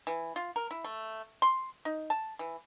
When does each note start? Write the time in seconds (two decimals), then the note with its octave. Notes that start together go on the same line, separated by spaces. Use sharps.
0.07 E3
0.36 F4
0.56 A#4
0.71 E4
0.84 A3
1.42 C6
1.85 D#4
2.10 A5
2.39 E3